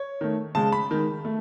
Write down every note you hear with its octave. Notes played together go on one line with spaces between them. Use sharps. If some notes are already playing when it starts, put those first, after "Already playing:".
Already playing: C#5
D#3 A3
C#3 G#3 A5
B5
D#3 G#3
A3